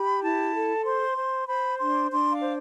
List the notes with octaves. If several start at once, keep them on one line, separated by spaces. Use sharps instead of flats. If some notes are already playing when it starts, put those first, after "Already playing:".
Already playing: G4 B5
E4 A5
A4
C5 C6
C5
C5 B5
D4 C6
D4 C6
F5
C5